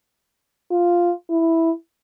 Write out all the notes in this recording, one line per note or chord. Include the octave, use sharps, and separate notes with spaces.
F4
E4